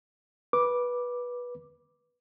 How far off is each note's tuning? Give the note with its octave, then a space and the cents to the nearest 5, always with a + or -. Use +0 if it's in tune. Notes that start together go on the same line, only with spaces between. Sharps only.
B4 -15 D6 +0